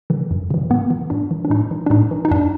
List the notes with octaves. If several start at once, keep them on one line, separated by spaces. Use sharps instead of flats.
C#3 E3
F#2
C#3 E3
G#2 B3
E3
G#2 D4
E3
D4
A2 D#4
E3
D4
A2 D#4
E3
D#4
F#2 D4